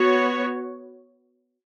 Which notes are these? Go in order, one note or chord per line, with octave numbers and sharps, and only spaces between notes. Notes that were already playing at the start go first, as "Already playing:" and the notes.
Already playing: B3 F#4 C#5